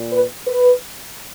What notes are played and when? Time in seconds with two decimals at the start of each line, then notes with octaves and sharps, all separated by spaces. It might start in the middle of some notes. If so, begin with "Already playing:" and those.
Already playing: A#2
0.10 B4
0.48 B4